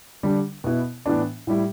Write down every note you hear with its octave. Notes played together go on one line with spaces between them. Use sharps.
D3 G3 D4
B2 B3 E4
A2 E3 B3 D4
A2 G3 E4